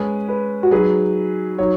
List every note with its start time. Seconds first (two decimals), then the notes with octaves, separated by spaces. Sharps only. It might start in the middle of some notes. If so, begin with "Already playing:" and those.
Already playing: G#3 C#4 G#4 B4
0.28 B4
0.63 F#4
0.71 F#3 D#4 G#4 B4
1.58 F#3 D#4 C#5